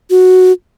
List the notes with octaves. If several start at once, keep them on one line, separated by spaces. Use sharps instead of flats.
F#4